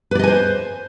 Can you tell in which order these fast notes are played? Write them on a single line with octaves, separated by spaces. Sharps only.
B4 D5 D#5 G#5 C5